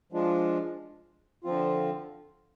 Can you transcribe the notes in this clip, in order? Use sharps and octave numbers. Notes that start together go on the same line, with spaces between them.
F3 G#3 D4 F4
D3 F3 C4 F4